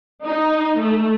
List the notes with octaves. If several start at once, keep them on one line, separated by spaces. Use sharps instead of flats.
D#4
A3